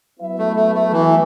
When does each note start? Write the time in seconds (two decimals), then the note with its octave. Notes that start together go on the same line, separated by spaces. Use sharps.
0.20 F#3 B3 E4 B4 E5
0.38 A3
0.56 A3
0.75 A3
0.93 E3